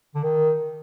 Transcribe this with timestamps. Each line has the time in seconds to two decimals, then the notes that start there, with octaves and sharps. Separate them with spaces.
0.15 D3
0.23 D#3